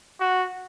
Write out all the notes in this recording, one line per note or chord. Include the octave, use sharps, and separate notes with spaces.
F#4